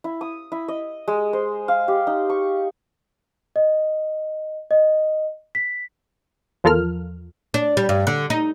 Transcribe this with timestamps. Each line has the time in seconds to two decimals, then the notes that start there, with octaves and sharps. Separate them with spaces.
0.04 E4
0.21 D#6
0.52 E4
0.68 D#5
1.08 G#3
1.33 C5
1.68 F5
1.88 G4
2.07 D#4
2.30 C#6
3.56 D#5
4.71 D#5
5.55 B6
6.64 E2 F3 F4 A4 A#4 F6
7.54 D4
7.77 G3
7.89 G2
8.07 D3
8.30 D#4